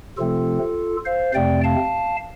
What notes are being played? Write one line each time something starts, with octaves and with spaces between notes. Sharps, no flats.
C3 F3 A3 C4 F4 A4
C5 F5
F2 C3 A3 C4 D5 G5
F5 A5